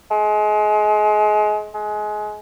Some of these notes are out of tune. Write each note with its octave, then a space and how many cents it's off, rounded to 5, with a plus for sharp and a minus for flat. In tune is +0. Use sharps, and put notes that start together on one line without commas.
G#3 +30
G#3 +25